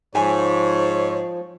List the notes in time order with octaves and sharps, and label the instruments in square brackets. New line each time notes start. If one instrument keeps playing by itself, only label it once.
[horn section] G#2 [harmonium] F3 [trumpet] C#5 [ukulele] G#5